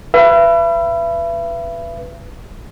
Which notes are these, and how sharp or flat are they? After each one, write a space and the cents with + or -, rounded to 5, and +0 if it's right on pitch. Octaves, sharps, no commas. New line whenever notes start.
B4 +0 E5 +40